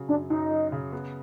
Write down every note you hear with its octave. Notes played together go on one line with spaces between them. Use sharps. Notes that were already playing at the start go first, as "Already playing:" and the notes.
Already playing: C#3 F#3
F#2 D4
F#2 D#4
F#3
C#3
B3